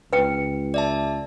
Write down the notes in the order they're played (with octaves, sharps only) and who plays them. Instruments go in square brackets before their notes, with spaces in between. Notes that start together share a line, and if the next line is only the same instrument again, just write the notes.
[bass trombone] C#2 [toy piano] B4 G5
[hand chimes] D5 E5 A5